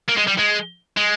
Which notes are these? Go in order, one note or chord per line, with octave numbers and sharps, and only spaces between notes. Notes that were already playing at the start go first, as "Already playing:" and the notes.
A#3
G#3
G3
G#3
G#3